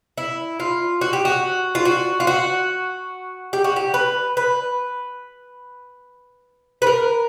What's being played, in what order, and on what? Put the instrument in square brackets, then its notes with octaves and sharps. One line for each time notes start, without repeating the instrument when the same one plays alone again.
[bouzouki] E4
F4
F#4
G4
F#4
F4
F#4
F4
F#4
G4
F#4
G4
B4
B4
B4
A#4